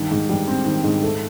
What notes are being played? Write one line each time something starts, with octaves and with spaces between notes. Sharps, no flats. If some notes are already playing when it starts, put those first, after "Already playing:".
Already playing: G2 D#3
G#2
G3
C4
D#3
G#2
A3